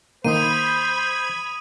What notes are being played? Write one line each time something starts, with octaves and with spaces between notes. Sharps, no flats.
D#3 A#3 C5 B5 D#6 G#6 D#7